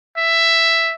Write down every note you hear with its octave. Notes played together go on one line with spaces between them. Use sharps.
E5